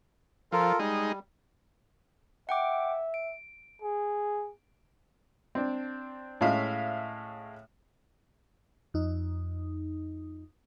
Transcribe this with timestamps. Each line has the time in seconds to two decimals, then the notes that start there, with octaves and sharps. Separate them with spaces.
0.52 F3 F4 A4 A#4
0.79 G3 G#3 D#4
2.49 E5 F#5 G5 D6
3.14 D7
3.82 G#4
5.55 C4 D4
6.41 A2 G#3 C#4 E5 F5
8.94 F2 D#4